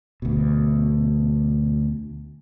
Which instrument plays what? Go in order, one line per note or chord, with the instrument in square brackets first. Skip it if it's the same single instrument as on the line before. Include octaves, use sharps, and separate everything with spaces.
[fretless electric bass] D2 B2